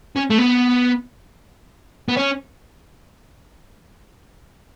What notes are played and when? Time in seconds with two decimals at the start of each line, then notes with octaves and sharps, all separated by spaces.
0.16 C#4
0.30 A3
0.38 B3
2.09 B3
2.17 C#4